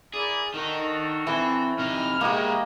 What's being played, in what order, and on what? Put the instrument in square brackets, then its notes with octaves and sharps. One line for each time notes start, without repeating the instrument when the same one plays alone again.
[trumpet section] E4 A#4 D5 [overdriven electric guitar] G#4
[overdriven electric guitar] D#3 D#4 [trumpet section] D4 F#4 A4
[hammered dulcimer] E3 [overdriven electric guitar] C4
[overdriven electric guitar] C3 D#4 [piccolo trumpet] F6
[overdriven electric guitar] G#3 F#4 [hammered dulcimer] A#3 G4 [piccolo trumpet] D#5